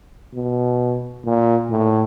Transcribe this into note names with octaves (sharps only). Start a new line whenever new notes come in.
B2
A#2
A2